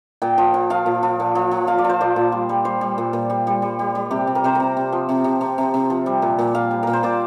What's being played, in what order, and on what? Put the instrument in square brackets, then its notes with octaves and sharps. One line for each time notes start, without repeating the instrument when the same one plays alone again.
[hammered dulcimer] A#2 G5
F3
F3
F3 F5
A#2
F3
A#2
F3
F3
F3 F5
D5
F3
C5
A#2 D5
A#2
G3
G3
G3 C5
G3
A#2
A#2
G3
G3
G3
G3
G3
C3 G4
C3
A#4
C3 C5
C3 A#4
C3
F3
C3
C3
C3
C3
C3
F3
G3
A#2
A#2
A#2 F5
G3
A#2 A#4
C5
A#2 D5